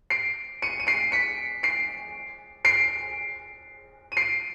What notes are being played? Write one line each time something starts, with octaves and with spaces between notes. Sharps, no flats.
C7 D7
C#7 D#7
D#7
C7 D7
B6 C#7
C7 D7
C7 D7
D#7
C7 D7